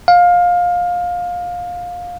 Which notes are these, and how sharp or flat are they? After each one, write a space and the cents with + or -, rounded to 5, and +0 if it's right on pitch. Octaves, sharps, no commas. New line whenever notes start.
F5 +20